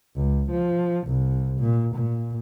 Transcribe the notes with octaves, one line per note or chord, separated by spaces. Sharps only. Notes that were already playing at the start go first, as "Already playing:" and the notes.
C#2
F3
C2
A#2
A#2